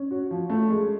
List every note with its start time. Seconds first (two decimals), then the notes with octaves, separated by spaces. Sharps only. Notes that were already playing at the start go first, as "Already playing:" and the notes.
Already playing: C#4
0.11 F#4
0.31 F3
0.50 A3
0.70 G#3